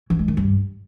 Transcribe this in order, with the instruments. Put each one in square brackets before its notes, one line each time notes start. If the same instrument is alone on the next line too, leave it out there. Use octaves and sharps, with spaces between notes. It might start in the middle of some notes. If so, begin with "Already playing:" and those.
[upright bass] E3
G#3
D#3
G2